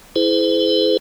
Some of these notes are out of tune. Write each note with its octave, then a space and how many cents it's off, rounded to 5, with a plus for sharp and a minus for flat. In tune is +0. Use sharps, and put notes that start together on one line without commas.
E4 +0 G#4 +35 C5 -40